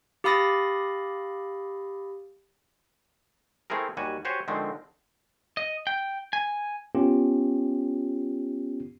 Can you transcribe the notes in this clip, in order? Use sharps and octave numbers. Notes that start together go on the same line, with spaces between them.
G4 F5 B5 D#6 A6 A#6
A3 C4 E4 G#4 A#4
D#2 G3 F#4 G#5
F#4 G4 C5 C#5 G#5
D3 D#3 F3 G#3 A3 C4
D#5
G5
G#5
B3 C#4 F4 G4